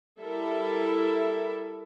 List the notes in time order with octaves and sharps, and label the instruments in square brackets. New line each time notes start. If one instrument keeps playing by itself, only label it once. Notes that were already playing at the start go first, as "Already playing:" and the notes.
[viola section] G3 E4 A4 A#4 E5